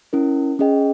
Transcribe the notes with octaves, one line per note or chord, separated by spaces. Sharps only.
C#4 E4 A#4
C#4 G#4 D#5 G5